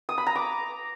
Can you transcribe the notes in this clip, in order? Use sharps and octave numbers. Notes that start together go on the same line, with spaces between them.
D#6
B5
A#5
D6